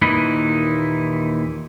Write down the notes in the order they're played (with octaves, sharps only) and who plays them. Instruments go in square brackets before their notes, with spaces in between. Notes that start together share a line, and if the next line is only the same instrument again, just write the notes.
[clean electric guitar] D#2 A#2 E3 D#4 E4 B4